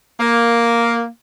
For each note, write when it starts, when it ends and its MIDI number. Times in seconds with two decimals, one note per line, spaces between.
0.20 1.06 58